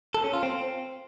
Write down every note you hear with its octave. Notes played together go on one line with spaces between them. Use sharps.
A4
C#4
F4
C4